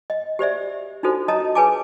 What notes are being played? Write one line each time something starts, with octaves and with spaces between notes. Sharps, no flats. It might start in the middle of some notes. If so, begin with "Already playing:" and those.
D#5
G4 C5 D5 E5
D4 D#4 F4 F#4 A4 C5
C#5 D#5 A5 A#5 D#6
G#4 B4 C#5 G#5 A5 D6